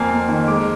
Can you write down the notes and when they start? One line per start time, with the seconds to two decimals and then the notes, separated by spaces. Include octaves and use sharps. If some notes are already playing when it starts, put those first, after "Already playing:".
Already playing: F2 A#3 G#5
0.10 A#3
0.29 D#3
0.48 G#3 D6